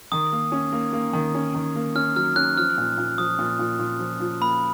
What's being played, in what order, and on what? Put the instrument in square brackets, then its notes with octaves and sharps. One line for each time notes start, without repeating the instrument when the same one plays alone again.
[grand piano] D#3 [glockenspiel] D#6
[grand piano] A#3
C#4
A#3
A#3
D#3
C#4
D#3
A#3
[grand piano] C#4 [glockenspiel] F6
[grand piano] F#3 [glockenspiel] F6
[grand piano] C#4 [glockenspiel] F#6
[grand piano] F3 [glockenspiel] F6
[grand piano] A#2
A#2
[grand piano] F3 [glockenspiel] D#6
[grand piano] A#2
A#2
A#2
F3
F3
[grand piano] A#3 [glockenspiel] B5